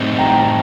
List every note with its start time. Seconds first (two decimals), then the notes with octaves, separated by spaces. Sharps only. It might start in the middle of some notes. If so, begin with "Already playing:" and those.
Already playing: A2 G3 C4 D#4
0.18 G5 A#5
0.30 G5
0.40 A5